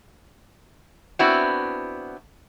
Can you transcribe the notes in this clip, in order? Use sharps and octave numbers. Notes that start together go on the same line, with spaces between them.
B3 C4 D4 E4 F#4